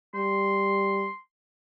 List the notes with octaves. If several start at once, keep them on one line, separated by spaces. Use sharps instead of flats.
G3 C6